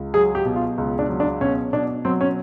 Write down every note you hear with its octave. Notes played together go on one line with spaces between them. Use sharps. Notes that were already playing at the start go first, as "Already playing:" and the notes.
Already playing: C#2
F#3 G#4
G4
B2
F4
C#2
D4
F#3
D4
B2 C#4
B2 D4
F#3 C4
C#4